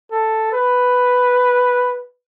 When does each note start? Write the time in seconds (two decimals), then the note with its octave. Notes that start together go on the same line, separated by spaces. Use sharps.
0.11 A4
0.52 B4